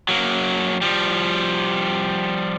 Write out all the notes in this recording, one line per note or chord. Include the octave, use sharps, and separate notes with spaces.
F#3 A#3
F3 G3